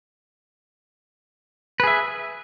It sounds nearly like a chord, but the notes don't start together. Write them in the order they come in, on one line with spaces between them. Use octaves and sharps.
B4 G#4 E5